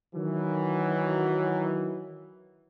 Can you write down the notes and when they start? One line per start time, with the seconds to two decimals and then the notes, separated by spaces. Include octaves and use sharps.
0.15 D#3 E3 F#3